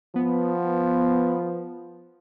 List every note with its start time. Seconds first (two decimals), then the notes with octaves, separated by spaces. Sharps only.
0.16 F3 B3